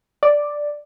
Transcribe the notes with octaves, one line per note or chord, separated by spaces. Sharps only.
D5